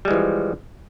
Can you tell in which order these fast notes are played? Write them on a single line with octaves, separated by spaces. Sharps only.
G3 G#3 E3 F3